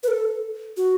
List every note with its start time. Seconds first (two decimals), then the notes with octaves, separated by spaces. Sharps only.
0.03 B4
0.08 A4
0.77 F#4